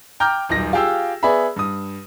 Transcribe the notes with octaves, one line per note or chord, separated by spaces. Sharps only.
G5 A#5 D6 F6 G6
D#1 B1 A#6
F4 G4 G#4 F5 G5 E6
B3 G#4 D5 E5 B5
G2 D#6